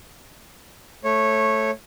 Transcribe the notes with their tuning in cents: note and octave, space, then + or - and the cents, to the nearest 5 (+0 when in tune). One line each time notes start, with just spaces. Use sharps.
A3 +0 C#5 -20